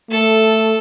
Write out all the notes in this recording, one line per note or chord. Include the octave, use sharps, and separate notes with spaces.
A3 A4